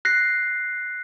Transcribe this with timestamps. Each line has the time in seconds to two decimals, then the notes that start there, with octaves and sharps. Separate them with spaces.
0.05 F#6 A#6 C7